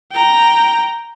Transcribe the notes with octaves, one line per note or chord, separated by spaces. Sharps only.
G5 A#5